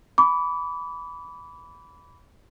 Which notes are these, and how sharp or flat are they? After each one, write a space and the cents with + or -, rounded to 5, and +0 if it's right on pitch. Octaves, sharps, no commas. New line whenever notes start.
B5 +0 D6 -30